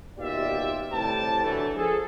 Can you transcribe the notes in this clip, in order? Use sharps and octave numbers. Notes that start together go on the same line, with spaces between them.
D#2 B2 F4 G4 D5 E5
A2 C3 G3 B4 G5 A5
D3 E3 F#3 A3
F3 G#4 A4